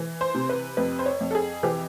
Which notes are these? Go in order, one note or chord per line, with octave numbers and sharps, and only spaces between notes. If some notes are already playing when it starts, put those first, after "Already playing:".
Already playing: E3
C5
C3
B4
F2 B4
C5
C#5
F2
A4
G#4
E3 G4